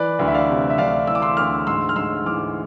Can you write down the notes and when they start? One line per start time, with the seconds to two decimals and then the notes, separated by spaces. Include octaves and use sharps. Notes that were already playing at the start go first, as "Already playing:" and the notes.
Already playing: E3 B4 D5
0.19 D2
0.27 E5
0.34 D5 F5
0.49 C3
0.70 E5
0.78 D2 D5 F5
1.07 E3 E6
1.15 D6
1.22 C6 E6
1.37 D2 D6 F6
1.67 G#2 C6 E6
1.89 F6
1.96 G#2 C6 E6
2.26 E3 D6 F6